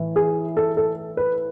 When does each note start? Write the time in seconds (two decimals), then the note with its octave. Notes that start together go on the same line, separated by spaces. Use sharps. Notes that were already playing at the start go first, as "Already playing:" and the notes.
Already playing: A2 E3
0.16 G#4
0.57 A4
0.77 A4
1.17 B4